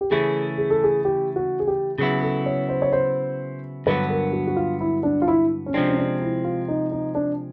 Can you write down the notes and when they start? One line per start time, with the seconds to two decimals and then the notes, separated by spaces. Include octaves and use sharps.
0.01 G4
0.10 C#3 E3 A3 C#4 E4 G#4
0.58 G#4
0.70 A4
0.84 G#4
1.05 G4
1.36 F#4
1.59 G#4
1.67 G4
1.98 C#3 F#3 B3 E4 G#4
2.23 A4
2.46 C#5
2.69 C5
2.82 C#5
2.92 C5
3.86 G2 D3 F#3 B3 B4
4.10 A#4
4.33 F#4
4.47 F#4
4.56 F4
4.81 E4
5.03 D4
5.22 F4
5.28 E4
5.66 C#4
5.74 C3 F3 G#3 C4 D4
5.87 C#4
5.98 D4
6.22 E4
6.44 F4
6.68 D#4
6.91 D#4
7.15 D4